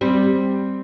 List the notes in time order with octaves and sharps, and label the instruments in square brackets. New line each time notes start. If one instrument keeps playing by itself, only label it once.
[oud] G3 [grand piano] C4